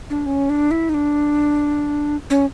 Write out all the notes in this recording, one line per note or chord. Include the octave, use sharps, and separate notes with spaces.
D4
C#4
D4
E4
D#4
D4
C#4